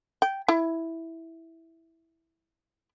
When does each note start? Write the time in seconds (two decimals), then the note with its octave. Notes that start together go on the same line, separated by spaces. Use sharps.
0.22 G5
0.48 E4